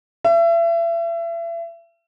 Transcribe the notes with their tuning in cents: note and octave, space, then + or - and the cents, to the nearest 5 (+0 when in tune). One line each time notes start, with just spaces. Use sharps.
E5 +35